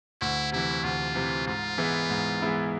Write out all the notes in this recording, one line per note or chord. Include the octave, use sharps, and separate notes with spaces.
D2 E4
C3 E3 E4
D2 F4
C3 E3
G#2 F4
E3 G#3 B3 E4
G#2
E3 G#3 B3 E4